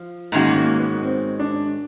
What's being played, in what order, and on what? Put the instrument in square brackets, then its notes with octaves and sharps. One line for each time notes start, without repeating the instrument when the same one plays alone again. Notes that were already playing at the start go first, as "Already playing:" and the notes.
Already playing: [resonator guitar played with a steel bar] F3
[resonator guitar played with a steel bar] G#2 D#3 G#3 C#4 F#4 [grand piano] A#3
[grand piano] A#3
B3
C4
D4